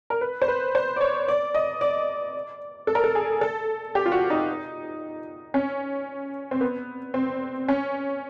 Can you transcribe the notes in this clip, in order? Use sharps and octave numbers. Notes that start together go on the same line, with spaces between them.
A#4
B4
C5
B4
C5
D5
C#5
D5
D#5
D5
A4
A#4
A4
G#4
A4
G4
F4
F#4
D#4
C#4
C4
B3
C4
C#4